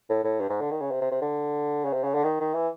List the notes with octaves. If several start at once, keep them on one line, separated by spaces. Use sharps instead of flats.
A2
A2
G2
G#2
D3
D#3
C#3
C3
C3
C3
D3
C#3
C3
C#3
D3
D#3
D#3
E3